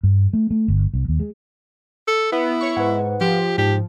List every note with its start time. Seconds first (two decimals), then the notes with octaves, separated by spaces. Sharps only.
0.03 G2
0.33 A3
0.51 A3
0.68 G1
0.94 C2
1.08 D#2
1.20 G#3
2.08 A4
2.32 B3 E4
2.61 C#5 C#6
2.77 G#2 B4 F#5
3.21 F3 G4
3.58 G#2 G4